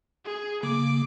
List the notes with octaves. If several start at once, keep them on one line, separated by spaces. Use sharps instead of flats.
G#4
C#3 A#3 D6